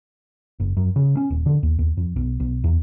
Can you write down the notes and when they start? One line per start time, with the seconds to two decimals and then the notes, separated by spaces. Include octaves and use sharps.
0.60 F#1
0.77 F#2
0.96 C#3
1.17 C#4
1.30 D#1
1.46 D3
1.63 D#2
1.79 D#2
1.97 F2
2.16 B1
2.40 B1
2.64 E2